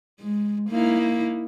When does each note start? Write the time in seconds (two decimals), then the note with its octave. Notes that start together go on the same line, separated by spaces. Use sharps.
0.20 G#3
0.70 A#3 D#4 E4